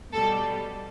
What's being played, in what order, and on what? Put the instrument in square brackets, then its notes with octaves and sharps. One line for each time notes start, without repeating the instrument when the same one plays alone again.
[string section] B2 G3 A4